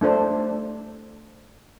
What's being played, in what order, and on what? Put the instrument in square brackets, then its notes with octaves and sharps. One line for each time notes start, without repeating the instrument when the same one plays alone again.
[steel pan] A3 D4 A4 C5